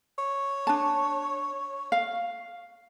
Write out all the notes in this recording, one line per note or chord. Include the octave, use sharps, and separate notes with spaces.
C#5
D4 A5
F5